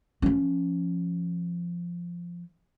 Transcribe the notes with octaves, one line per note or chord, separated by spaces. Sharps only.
F3 C#4